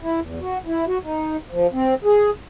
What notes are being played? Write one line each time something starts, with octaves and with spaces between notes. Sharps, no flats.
E4
E2
F#4
E4
F#4
D#4
F3
C4
G#4